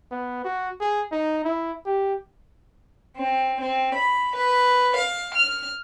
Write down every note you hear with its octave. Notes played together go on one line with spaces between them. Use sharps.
B3
F#4
G#4
D#4
E4
G4
C4
C4
B5
B4
F5
F6